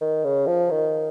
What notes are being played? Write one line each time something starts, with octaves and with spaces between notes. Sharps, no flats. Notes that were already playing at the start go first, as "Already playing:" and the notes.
D#3
C#3
F3
D#3